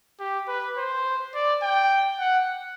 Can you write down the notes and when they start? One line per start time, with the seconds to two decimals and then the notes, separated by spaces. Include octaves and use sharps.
0.20 G4
0.48 B4
0.77 C5
1.34 D5
1.63 G5
2.19 F#5